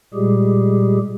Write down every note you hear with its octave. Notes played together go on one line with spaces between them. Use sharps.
A#2 G3 G#3 G4 G#4